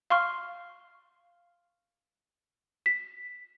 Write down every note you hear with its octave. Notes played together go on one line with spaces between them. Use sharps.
F5 C6 C#6 F6
B6